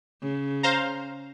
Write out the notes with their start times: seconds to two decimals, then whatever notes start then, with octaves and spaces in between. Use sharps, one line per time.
0.21 C#3
0.63 C5 F5 A#5